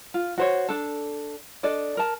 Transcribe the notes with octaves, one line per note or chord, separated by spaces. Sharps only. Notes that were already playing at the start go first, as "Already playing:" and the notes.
F4
F#4 C5 C#5
D4 A4
D4 A4 D5 D#5
A#4 A5